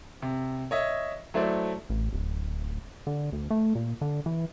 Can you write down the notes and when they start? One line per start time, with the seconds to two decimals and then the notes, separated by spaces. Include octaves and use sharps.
0.22 C3
0.71 C#5 D#5 E5
1.34 F#3 A3 E4 C5 D5
1.90 A1
2.13 D1
3.07 D3
3.32 D2
3.50 A3
3.75 A#2
4.01 D3
4.26 E3